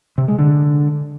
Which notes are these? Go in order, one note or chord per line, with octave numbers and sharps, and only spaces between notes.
C3
G#3
D3